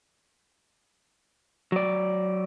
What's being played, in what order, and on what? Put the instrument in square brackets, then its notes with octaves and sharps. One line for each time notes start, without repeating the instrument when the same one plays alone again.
[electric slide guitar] F#3 D5